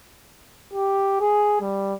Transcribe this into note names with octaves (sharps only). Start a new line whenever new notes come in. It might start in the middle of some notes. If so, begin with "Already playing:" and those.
G4
G#4
G3